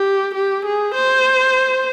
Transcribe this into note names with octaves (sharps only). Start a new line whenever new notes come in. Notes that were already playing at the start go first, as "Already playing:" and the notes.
Already playing: G4
G4
G#4
C5